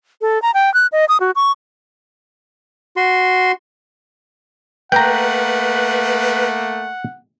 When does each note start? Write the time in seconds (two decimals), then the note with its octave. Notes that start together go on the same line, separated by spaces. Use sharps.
0.21 A4
0.42 A#5
0.54 G5
0.74 F#6
0.92 D#5
1.09 D#6
1.20 F#4
1.36 C#6
2.97 F#4 C6
4.92 A3 A#3 B4 F#5 G5 A#5